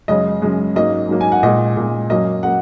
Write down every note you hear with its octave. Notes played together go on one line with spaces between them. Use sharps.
F#2 C#3 G#3 D#5
F#2 C#3 G#3
G#2 F#3 A#3 D#5
G#2 F#3 A#3
G#5
F#5
A#2 G#3 D#5
A#2 G#3
F#2 F#3 A#3 D#5
F#3 A#3 F#5